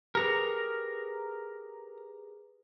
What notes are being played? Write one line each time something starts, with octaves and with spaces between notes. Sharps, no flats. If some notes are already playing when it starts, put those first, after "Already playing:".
G4 G#4 A#4 B4 A#5